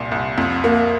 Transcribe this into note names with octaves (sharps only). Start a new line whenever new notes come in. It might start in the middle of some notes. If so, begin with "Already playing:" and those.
Already playing: C2 A#2
C2
F2
A#3